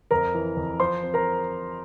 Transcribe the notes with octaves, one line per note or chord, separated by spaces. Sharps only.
F2 A#4 A#5
E3
F2
F3 C5 C6
C4
A#4 A#5